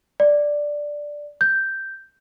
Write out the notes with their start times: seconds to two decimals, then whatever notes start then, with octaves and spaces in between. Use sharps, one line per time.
0.20 D5
1.41 G6